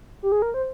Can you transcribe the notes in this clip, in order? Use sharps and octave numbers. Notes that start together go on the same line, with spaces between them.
G4
G#4
A#4
C5